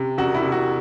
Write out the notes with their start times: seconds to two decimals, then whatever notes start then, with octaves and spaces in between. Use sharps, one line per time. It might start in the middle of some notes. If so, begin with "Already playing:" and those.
Already playing: C3
0.18 E1 F#4
0.35 E4
0.44 C3
0.52 F#4